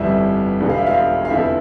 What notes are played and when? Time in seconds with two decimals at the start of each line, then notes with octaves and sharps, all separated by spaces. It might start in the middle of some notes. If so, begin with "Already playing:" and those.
Already playing: G1 F2 E3 G3 E4 E5
0.60 E1 E2 D3 G3
0.70 F5
0.78 E5
0.87 F4 F5
1.25 F5
1.30 F1 E2 D3 F3 E4 E5